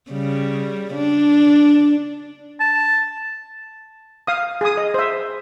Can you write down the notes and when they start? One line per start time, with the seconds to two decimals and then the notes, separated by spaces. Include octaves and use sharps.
0.11 C#3 G3
0.95 D4
2.60 A5
4.27 F5 D#6
4.61 G#4 G#5 D#6
4.77 D#5
4.94 C5 E5